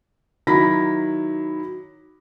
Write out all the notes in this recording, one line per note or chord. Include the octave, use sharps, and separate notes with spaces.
D#3 F#3 E4 B5 A#6 B6